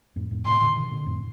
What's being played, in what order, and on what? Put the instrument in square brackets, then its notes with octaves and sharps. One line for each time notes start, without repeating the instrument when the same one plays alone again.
[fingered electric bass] F2 A2
F2 A2
[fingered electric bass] A2 C3 [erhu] C6
[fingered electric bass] A#2 D3
C3 D#3
A#2 D3
F2 A2